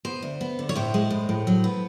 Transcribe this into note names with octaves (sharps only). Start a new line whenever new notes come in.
B3 C5
D2
B3
D3
C#5
A2 C5
G#3
A2
A2
F#3
B3